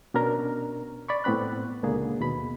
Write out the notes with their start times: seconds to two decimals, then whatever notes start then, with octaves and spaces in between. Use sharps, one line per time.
0.14 B2 C#4 D4 A#4 A#5
1.09 D5 B5 C#6
1.24 A2 B3 C4 B5 F#6
1.83 C#2 A#2 D3 A#3 G#4
2.19 D#2 B2 B5